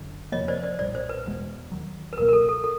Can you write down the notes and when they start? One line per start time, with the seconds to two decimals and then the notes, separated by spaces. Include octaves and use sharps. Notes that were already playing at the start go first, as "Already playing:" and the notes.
Already playing: F#1 F#2 D3
0.32 F2 C3 F3 A#3 C#5 D#5
0.48 C5 D5
0.63 C5 D5
0.79 B1 A#2 G3 C5 D5
0.95 C5
1.09 B4
1.26 E1 E2 B2 G#3
1.72 D#2 D#3 F#3
2.13 B4
2.18 C#2 B2 F#3 A#3 A#4
2.29 A#4
2.33 A4
2.49 A4
2.64 A4